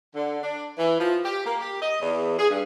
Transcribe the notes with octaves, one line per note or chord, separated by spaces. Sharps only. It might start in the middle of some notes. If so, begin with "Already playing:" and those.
D3
D4
E3
F3
G4
A#3
G4
D#5
E2
G#4
G2